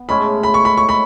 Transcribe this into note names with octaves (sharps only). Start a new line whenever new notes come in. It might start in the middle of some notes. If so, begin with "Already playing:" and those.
Already playing: B3
A2 G#3 C#4 E4 B5
B5
C#6
B5
C#6
B5